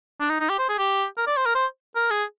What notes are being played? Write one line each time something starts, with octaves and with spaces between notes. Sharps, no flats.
D4
D#4
D#4
G4
C5
G#4
G4
A#4
D5
C5
A#4
C5
A#4
G#4